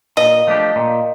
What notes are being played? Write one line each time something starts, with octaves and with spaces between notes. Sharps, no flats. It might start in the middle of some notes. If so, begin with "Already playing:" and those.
A#2 D#5
F3 A3 D4 G4
A#2